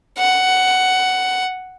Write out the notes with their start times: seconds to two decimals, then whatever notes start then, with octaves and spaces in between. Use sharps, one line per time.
0.19 F#5